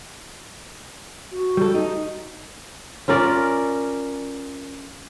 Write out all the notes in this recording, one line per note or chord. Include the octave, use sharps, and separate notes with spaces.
F#4
G3 A4
D#4
C#4 F4 A#4 D5